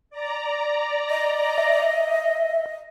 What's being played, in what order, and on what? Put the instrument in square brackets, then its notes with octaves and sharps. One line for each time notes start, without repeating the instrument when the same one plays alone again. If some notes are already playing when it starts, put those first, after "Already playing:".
[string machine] D5 A#5
[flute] D#5
[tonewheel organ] E5